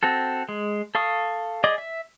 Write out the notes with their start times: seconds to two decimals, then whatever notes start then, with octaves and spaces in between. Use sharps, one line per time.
0.03 C4 F#4 A4
0.49 G#3
0.95 A4 F5 C#6 D#6
1.64 G#4 D5 D#5 D6
1.78 E5